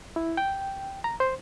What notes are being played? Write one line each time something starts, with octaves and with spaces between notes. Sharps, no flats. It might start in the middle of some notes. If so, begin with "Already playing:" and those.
E4
G5
A#5
C5